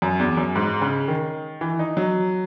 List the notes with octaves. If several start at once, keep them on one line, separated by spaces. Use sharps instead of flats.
F#2
E2
F#2
G#2
C#3
D#3
E3
D#4
F#3